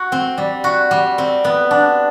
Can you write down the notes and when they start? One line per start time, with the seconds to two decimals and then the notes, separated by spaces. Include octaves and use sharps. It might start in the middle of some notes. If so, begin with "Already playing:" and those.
Already playing: F#4
0.12 C4
0.38 G3
0.64 F#4
0.91 G3
1.18 C4
1.45 B3
1.71 D4